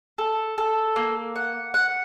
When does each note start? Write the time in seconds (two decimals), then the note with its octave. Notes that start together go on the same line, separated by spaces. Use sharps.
0.18 A4
0.58 A4
0.96 A#3
1.36 F#5
1.74 F#5